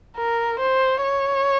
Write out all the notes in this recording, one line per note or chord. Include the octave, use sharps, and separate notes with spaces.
A#4
C5
C#5